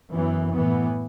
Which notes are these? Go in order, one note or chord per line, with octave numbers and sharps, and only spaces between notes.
F#2 E3 B3
A2 E3 B3